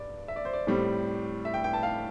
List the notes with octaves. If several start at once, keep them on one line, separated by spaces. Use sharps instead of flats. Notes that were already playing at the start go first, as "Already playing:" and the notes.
Already playing: G2 D5
E5
D5
C5
D5
A2 G3 C4
E5
G5
G5
A5
F5